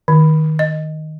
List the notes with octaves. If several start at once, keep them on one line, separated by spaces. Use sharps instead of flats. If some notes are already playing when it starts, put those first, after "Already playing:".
D#3
D#5